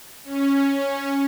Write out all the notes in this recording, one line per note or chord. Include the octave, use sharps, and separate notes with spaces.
C#4